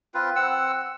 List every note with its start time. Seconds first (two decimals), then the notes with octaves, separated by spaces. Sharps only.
0.14 C4 F4 B4
0.36 C4 F#5 E6